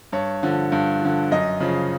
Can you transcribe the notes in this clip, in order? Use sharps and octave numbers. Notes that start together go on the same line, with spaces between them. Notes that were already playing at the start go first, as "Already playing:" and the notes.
G2 C#5
D3 F3
G2
D3 F3
F#2 D#5
C#3 F3